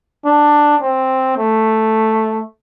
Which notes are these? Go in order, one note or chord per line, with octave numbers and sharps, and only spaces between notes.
D4
C4
A3